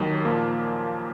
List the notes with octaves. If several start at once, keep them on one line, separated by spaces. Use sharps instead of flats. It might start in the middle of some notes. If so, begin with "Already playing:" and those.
Already playing: D#2 D#3 F#3
A#2 F3 A#3